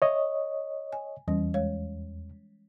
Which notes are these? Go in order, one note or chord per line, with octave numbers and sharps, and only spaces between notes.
C#5 D#5 E5
G#5
E2 E3 G3 C#4
G#3 C#5 F5